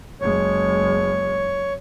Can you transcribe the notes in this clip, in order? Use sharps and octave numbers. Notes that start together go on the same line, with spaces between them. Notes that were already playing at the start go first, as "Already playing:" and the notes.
F#1 G#3 C#5